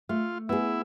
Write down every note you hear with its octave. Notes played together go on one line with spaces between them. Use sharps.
A3 F4
B3 E4 G#4